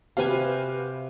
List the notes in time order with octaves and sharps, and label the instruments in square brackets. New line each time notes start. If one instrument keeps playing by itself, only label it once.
[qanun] C3 G4 G#5 [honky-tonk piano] F#4 B4 F5